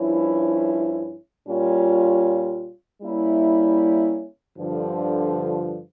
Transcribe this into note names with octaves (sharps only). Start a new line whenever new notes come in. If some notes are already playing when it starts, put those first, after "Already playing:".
Already playing: G2 F3 C#4 E4
A#2 G3 C#4 F4
G3 A#3 C#4 E4
G2 D3 F3